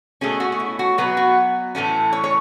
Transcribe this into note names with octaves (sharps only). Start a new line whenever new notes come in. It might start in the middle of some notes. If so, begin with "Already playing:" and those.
B2 A3 C#4 G#4
F#4
F#4
E4
F#4
B2 F#3 B3 B4
F#4
A2 E3 A3 C#4
C#5
C#5